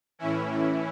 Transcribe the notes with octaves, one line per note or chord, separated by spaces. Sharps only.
A2 E3 C#4 E4
A2 E3